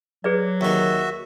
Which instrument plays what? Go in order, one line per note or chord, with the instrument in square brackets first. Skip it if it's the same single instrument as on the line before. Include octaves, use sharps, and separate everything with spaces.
[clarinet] F#3 [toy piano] G#4 B4 D5
[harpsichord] D#2 D#3 [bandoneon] F#4 E5